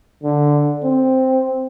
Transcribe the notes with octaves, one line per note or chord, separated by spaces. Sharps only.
D3
C4